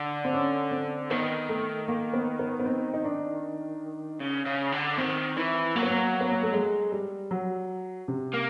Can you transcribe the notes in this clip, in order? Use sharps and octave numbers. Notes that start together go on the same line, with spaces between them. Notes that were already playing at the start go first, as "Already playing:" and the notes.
Already playing: D3
C4
C#4
C4
D#3 B3
A3
A#3
B3
B3
B3
C4
D#4
D4
C#3
C#3
D3
D#3 C4
E3
F#3 A#3
B3
A#3
B3
A#3
A3
G#3
G3
F#3
C3
A#3